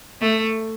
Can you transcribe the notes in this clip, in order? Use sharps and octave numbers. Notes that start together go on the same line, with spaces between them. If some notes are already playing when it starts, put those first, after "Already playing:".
A3